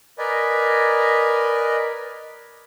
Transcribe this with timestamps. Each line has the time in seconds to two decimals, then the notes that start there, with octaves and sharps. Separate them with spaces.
0.18 A#4 B4 D5 D#5 G#5